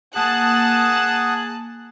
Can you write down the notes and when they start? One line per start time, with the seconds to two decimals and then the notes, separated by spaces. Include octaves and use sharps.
0.16 A#3 G#4 F#5 A5 D#6 F#6